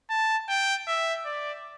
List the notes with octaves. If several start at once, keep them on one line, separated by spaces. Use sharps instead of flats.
A5
G5
E5
D5